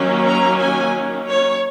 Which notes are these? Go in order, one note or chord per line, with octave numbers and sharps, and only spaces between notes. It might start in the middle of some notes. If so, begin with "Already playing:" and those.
Already playing: D#3 F#3 A#3 C#4
A#5
G#5
C#5